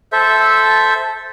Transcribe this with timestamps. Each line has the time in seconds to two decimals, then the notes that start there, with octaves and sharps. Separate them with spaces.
0.12 A4 C5 E5